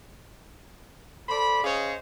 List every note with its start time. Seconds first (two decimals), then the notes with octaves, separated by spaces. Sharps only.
1.29 A4 C5 D5 B5
1.64 C#4 G#4 C5 C#5 D#5 F5